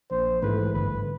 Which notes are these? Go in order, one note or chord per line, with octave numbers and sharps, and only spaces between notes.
A#1 C5
G#2 E3 A3 B4
G1 B4